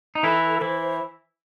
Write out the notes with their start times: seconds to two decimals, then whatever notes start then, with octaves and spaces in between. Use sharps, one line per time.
0.15 D#4
0.23 E3 E4 A4
0.61 E3 E4 C5